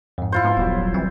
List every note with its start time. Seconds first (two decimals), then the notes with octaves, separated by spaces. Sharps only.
0.18 F2 G#2
0.32 E4 F4 C5 C#7
0.45 G#2 B3
0.57 D#1 A#1 F#3 G3 B3
0.94 E3 C4